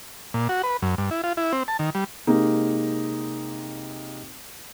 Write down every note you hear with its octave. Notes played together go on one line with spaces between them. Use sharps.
A#2
F#4
B4
F#2
G2
E4
F4
E4
C4
A5
D#3
G3
C3 G#3 A#3 D#4